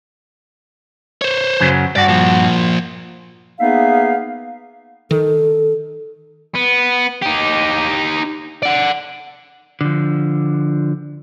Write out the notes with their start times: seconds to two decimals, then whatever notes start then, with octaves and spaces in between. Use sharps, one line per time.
1.22 C5 C#5
1.60 F#2 C#3 F#3
1.96 G2 F#4 D5
2.08 A#2 F3
3.60 A#3 B3 D#4 G#4 E5 F5
5.11 D#3 A4
6.55 B3
7.22 D#4 G4
8.62 D5 F#5
9.81 D3 F3